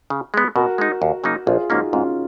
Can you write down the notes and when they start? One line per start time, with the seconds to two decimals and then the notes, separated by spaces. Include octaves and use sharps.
0.10 C#3
0.34 G#3 B3
0.56 B2 F#4 A#4
0.78 G#3 D#4
1.02 D#2
1.24 C#3 F#3 A#3 D#4
1.46 A#1 F4 G#4
1.70 G#2 F3 A#3 C#4 D#4 F#4
1.93 G#2 C#4 F4